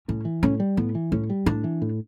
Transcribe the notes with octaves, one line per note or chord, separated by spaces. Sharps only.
A2 C#4
E3
A2 C#4
G3
A2 B3
E3
A2 C#4
G3
A2 D4
E3
A2